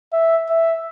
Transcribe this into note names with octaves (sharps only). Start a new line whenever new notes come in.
E5
E5